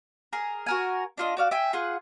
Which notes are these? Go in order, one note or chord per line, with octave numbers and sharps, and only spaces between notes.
G#4 A#4
F#4 A#4 G#5
D4 F4 D#5
F#4 D5 F5
E5 G5 G#5
F4 G#4 F#5